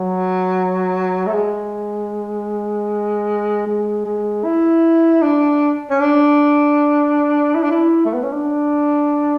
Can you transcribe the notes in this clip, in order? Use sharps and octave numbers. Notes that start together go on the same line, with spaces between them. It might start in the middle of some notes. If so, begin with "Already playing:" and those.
Already playing: F#3
A3
G#3
G#3
G#3
E4
D4
C#4
D4
E4
D4
E4
A3
B3
C#4
D4